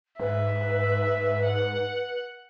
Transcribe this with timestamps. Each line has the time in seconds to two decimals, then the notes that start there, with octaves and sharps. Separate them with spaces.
0.20 G#2 B4 E5
1.47 F#5